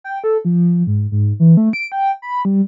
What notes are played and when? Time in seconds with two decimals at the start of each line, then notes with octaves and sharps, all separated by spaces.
0.04 G5
0.24 A4
0.45 F3
0.87 G#2
1.12 G#2
1.40 E3
1.57 A3
1.73 D7
1.92 G5
2.22 B5
2.45 G3